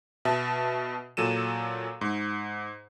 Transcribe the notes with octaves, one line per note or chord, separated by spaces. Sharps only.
B2 E5 A5
A#2 F#3 A4 D#7 E7
G#2